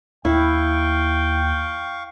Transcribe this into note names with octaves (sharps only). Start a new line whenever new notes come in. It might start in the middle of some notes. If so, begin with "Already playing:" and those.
D#2 E4 F5 G5 C#6